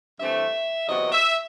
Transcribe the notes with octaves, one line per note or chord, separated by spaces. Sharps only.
G2 E3 A3 C4 E5
E2 C3 F#3 B3 D#5
E5